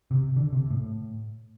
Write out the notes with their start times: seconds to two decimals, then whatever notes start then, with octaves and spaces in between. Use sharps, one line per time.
0.11 C3
0.36 D3
0.53 C3
0.70 A2